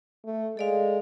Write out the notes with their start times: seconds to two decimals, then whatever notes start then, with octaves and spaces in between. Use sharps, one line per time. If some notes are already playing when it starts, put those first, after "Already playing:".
0.25 A3
0.57 G#3 A4 D5 F5